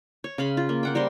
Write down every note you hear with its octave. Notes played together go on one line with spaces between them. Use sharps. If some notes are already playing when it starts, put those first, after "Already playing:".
C#5
C#3 F5 B5 C6
F4
A#3
A#3 F#5 G5
G3 A#4 C5 C6